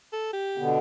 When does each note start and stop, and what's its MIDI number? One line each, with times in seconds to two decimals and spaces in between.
0.12 0.32 69
0.33 0.72 67
0.58 0.78 47
0.58 0.78 50
0.58 0.78 59